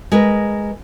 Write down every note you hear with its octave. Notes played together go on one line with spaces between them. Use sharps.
G#3 A#4 B4